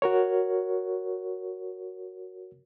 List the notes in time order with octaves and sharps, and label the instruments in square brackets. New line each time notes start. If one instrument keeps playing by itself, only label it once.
[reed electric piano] F#4 A#4 C#5